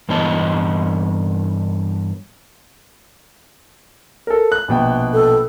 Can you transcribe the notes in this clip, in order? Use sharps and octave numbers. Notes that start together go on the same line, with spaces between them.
G2 E3 B3 C#5 D#5 A5
A4 A#4
F#6
A#1 B2 G5
A4